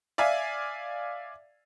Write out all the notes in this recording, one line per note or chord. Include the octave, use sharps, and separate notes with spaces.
D5 E5 F5 G#5